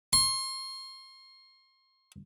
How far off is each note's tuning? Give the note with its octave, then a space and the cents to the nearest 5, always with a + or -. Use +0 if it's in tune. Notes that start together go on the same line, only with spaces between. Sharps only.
C6 +30